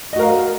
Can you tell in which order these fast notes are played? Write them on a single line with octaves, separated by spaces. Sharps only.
D#5 F#4 A#4 F5